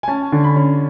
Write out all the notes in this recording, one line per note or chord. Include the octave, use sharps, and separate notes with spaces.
G#5
C#4 A5
D3
B5
C#4